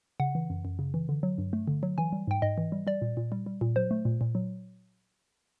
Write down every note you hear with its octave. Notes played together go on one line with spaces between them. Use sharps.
C#3 F#5
E3
F#2
F#2
C#3
E3
D3
F#3
G2
A3
D3
F#3
E3 G#5
G3
G#2 G5
G#2 D#5
E3
G3
G3 D5
A#2
A#2
G3
G3
A#2
F#3 C5
A3
A#2
A#2
F#3